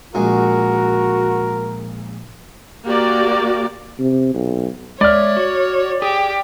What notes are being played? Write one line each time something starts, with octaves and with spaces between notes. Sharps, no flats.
A#1 G#3 F#4 A#4
A#3 F#4 G4 D5
C3
B1
G#3 C#5 D5 E5 F6
F#4
G4 G#4